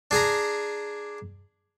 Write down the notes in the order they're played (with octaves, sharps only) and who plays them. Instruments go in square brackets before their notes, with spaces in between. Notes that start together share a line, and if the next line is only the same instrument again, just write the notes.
[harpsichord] D4 G#4 G#5 A#5